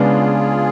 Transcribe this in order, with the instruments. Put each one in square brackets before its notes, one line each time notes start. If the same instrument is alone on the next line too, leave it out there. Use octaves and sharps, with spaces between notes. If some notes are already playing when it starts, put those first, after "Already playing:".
Already playing: [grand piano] C#3 G#3 B3 D4 [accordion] F4 G#4